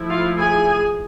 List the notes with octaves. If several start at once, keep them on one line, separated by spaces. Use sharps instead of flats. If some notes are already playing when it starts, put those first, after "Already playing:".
Already playing: F3 A3 E4
F4 F5
G#4 G#5